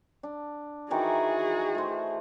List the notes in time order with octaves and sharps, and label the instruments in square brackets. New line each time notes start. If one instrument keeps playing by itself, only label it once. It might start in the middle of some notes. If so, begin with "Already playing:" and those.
[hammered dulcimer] D4
[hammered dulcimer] D#3 E3 A#5 [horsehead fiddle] F#4 G#4
[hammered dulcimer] A3 C5